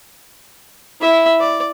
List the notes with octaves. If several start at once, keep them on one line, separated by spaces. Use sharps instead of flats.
E4 E5
D5